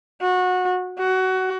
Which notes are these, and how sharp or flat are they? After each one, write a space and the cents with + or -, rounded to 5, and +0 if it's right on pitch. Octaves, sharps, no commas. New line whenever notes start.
F#4 -20
F#4 +20